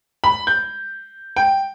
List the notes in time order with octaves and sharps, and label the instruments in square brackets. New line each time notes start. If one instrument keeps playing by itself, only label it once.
[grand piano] B5
G6
G5